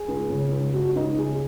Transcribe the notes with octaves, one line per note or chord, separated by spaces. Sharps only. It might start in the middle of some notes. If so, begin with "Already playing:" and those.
Already playing: G#4
C#2
C#3
C#2
C#3 F#4
C#2 D#4
C#3 G#4